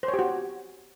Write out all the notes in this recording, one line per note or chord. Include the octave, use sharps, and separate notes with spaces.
C5
C#5
G4
F#4